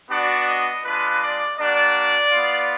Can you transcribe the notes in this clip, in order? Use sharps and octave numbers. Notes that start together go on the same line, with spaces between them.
B3 D4 F#4 D5
D#5
G#3 D4 F4 B4
D5
A#3 D4 F#4 D5
B3 F4